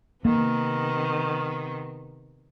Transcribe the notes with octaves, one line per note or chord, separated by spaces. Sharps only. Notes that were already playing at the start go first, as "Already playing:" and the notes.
C3 D#3 A#3 B3